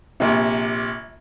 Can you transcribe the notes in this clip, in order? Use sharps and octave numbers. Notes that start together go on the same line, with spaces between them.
A#1 C3